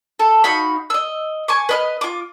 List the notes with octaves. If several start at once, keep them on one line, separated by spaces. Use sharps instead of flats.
A4
D#4 F#4 F5 B5
D#5 E6
G#5 C#6 D6
B4 D#5 F6
F4 D6